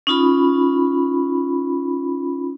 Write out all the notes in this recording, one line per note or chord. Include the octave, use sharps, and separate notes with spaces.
C#4 D#4 F4 B5